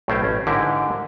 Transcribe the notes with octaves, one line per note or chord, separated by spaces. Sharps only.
B1 A2 A3 C#4 C5 G5
A1 C#4
G#2 D3 E4 G4 A#4 E5